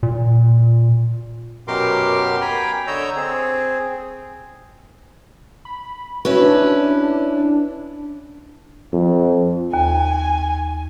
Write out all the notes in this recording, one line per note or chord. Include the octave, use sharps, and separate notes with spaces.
A#2
F#2 B2 G4 A#4 C6 D6
G5 G#5 A#5 B5
D3 C#5 D#5 A#5 E6 G6
C4 G#4
B5
C#4 E4 F#4 B4
D4
F2
D#2 G#5